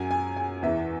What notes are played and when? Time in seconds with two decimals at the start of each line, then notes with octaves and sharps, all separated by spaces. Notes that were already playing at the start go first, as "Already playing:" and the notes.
Already playing: F#2 F#3 G#5
0.11 G#5
0.36 G#5
0.62 E2 E3 E5